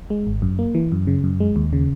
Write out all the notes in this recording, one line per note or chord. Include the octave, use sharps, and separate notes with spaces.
G#3
G#1
F#2
A#3
E3
F#2
C#3
F#2
G#3
D#2
C#3